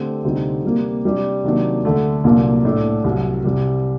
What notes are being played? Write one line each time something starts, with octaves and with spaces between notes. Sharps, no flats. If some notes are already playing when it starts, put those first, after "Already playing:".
Already playing: D3 A3 C4 G4
D2 C3 G3 C4 D#4
C3 G3 A#3
C3 G3 D4
C3 D#3 F#3 A#3 D4
D2 D3 A3
C2 A#2 F#3 A#3 D4
A2 A3 D4 A4
C2 C3 F#3
C2 C3 G3